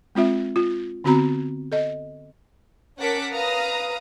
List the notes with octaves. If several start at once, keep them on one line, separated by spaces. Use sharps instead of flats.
G#3 C4 F4 E5
F4
D3 B3 C4 F#4 A#5 B5
A4 D#5
C#4 A#4 F#5 A5 D6 B6
B4 F5 A#5 D#6